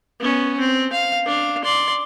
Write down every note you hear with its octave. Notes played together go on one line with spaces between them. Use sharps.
B3 C#4
C4
F5
D4 F5
D5 C6